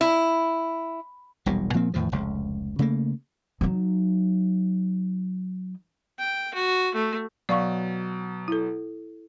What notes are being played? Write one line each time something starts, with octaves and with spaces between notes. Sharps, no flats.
E4
E1 B1 A#2 G3
A#2 F3 A#3 C4
E2 A2 D#3 F3
F1 C#2
C#3 A3 A#3
F#3 D#4
G5
F#4
A3
B2 F#3 D5 F5 C#6
E4 A4